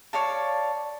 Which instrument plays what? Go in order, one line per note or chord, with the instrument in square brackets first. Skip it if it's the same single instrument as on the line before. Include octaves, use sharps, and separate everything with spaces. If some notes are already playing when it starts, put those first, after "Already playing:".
[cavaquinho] C#5 D5 F5 A5